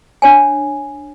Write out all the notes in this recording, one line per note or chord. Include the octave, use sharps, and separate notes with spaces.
D4 C#5 G#5